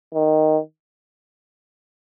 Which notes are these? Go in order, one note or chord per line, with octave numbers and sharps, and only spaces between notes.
D#3